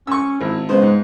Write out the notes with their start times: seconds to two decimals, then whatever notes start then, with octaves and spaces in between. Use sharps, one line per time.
0.07 C#4 C#6 E6
0.41 G#1 E4
0.69 C#3 G#3 B3 C5
0.82 G#2